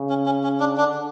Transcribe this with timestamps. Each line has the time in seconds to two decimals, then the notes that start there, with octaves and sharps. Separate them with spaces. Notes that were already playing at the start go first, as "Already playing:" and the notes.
Already playing: C#3
0.09 C#4
0.26 C#4
0.44 C#4
0.60 D4
0.77 D3 D4